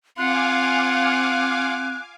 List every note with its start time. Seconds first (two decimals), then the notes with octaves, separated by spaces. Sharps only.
0.18 C4 F4 F5 F#5 G#5 D6 F#6